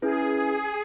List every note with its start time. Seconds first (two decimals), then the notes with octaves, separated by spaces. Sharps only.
0.02 C#4 E4 G#4 B4